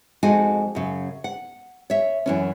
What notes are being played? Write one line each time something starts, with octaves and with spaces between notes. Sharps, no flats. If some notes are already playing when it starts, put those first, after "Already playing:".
F2 G#3 D#4 F#4 G#5
F#2 C#3
F#5
C#5 E5
F#2 E3 C#4